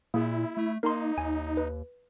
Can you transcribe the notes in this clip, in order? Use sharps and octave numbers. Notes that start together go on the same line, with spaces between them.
A#2 A#3 E4 G#4
A3
A#3 D#4 A#4 A#5 C6
D#2 G#5
B4